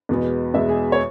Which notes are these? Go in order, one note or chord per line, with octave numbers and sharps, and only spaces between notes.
E2 B2 G#3 B3
E2 B2 G#3 B3 E5
G#4
C#5